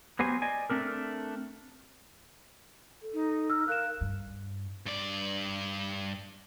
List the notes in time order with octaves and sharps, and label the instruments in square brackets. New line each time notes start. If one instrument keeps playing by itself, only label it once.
[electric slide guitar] F#3 B3 G4 C5 G#5
D5 D#5 G#5
A3 C4 D4 A#4
[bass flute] A4
[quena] D#4
[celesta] E6 F6
[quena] A#4 [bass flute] F5 [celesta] F#6 E7
[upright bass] G2
[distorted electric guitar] G2 D5